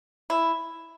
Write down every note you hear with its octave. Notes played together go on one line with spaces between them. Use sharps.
E4